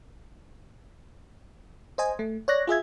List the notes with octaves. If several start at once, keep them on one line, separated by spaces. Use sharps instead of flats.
C5 D#5 G#5
A3
C#5 D5 F#6 A#6
F4 G#4 E5 G#6